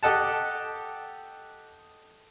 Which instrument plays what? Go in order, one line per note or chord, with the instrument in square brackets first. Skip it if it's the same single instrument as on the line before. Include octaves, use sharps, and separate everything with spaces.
[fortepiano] G4 A4 D#5 F#5 A5